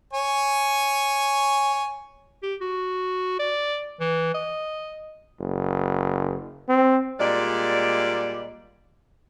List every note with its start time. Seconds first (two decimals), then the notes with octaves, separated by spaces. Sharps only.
0.13 C#5 G#5
2.43 G4
2.61 F#4
3.39 D5
4.00 E3
4.34 D#5
5.39 F#1
6.69 C4
7.20 A#2 G3 G#3 D5